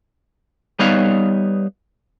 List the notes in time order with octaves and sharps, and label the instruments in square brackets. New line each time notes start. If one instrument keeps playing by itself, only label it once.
[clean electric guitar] G3 B3 D#4 B4 C#5 F5